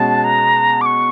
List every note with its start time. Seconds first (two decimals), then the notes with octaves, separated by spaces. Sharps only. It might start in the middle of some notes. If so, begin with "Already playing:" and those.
Already playing: B2 G#3 C#4 F#4 A5
0.24 A#5
0.81 D6
0.86 C#6